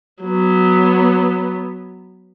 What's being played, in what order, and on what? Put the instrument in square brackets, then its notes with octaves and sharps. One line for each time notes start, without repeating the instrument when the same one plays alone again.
[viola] F#3 B3